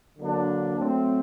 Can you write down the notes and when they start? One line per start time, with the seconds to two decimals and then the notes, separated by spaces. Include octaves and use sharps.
0.18 D3 F#3 A#3 D4
0.77 F#3 A3 C4